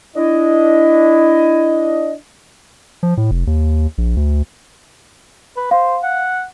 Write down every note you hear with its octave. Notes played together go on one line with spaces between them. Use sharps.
D4 E4 D#5
F3
A2
F1
D#2
A#1
D2
B4
C5 F5
F#5